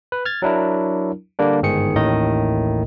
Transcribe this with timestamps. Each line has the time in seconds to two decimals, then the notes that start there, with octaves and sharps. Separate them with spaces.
0.12 B4
0.25 F6 G#6 A6
0.42 F#3 D4 E4 A#4
1.39 D3 G3 A#3 D4
1.62 G1 G#2 D#3 G#4 C#7
1.95 A1 D#2 A2 D#3 D#4 D#5